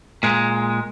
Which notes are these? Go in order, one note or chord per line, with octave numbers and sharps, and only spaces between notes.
A#2 G#3